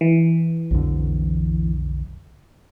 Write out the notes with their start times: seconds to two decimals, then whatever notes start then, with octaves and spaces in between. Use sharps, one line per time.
0.01 E3
0.71 B1 F2 D3